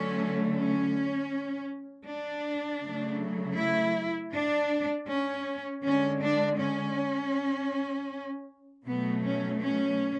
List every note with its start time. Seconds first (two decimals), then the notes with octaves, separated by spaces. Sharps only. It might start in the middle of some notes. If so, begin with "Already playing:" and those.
Already playing: D3 F#3 A3 C#4
0.54 C#4
2.06 D4
2.81 C#3 F#3 A3
3.57 E4
4.32 D4
5.08 C#4
5.83 D3 G#3 C#4
6.22 D4
6.59 C#4
8.86 B2 F#3 A3 B3
9.24 C#4
9.62 C#4